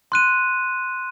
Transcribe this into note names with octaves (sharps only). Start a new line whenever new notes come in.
C6 F#6 D#7